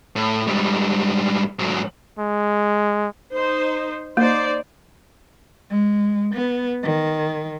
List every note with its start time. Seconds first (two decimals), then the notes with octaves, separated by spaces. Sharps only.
0.16 A2
0.47 G#2 G3
1.59 G#2 F#3
2.19 G#3
3.33 D#4 C5
4.17 A#3 D#4 C5 D5
5.70 G#3
6.34 B3
6.83 D#3